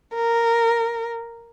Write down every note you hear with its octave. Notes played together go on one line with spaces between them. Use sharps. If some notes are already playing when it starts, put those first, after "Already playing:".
A#4